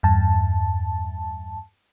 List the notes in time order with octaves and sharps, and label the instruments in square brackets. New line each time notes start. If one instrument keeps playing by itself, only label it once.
[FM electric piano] E2 G2 A5